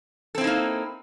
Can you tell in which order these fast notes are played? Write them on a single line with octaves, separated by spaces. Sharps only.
A4 C4 E4 D#4 A#3